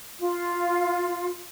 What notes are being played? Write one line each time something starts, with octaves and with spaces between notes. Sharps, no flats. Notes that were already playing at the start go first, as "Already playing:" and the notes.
F4